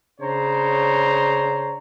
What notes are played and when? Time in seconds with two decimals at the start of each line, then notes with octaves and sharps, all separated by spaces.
0.20 C#3 D4 C5 C#5 A#5